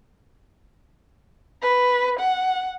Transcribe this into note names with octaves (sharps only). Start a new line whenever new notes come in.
B4
F#5